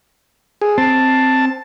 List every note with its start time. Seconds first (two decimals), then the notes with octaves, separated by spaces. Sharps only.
0.61 G#4
0.78 C4 A5